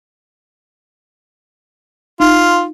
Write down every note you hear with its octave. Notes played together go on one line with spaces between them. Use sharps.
D#4 F4